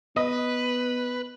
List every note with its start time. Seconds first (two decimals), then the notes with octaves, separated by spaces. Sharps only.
0.17 B3 B4 D#5